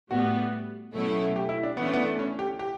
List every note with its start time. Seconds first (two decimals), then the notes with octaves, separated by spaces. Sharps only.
0.11 A2 G3 B3 F#4
0.94 B2 F#3 A3 C#4 E4
1.36 G4
1.49 E4
1.63 D4
1.77 E3 A3 B3 D4
1.85 C#4
1.93 B3
2.19 C#4
2.39 G4
2.59 G4